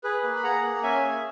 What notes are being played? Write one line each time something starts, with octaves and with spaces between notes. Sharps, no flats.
G#4 B4
A#3
B5
G#4 F#5 A#5
A#3
C#4 E5 G#5
G#4